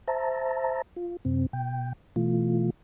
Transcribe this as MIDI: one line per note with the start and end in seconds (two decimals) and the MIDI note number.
0.08 0.82 72
0.08 0.82 76
0.08 0.82 81
0.08 0.82 82
0.96 1.17 65
1.25 1.46 42
1.25 1.46 48
1.25 1.46 60
1.53 1.93 47
1.53 1.93 79
2.16 2.70 47
2.16 2.70 52
2.16 2.70 57
2.16 2.70 65